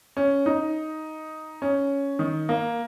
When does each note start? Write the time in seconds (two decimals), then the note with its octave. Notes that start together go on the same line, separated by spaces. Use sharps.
0.17 C#4
0.46 D#4
1.62 C#4
2.19 D#3
2.49 A#3